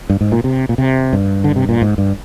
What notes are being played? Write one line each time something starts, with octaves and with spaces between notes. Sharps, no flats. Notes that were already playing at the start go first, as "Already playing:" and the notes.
G2
G#2
A#2
C3
A#2
C3
G2
D3
C3
A#2
G#2
G2